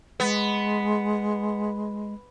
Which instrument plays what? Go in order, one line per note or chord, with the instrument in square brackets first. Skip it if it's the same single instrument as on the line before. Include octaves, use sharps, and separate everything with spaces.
[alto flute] G#3 [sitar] B3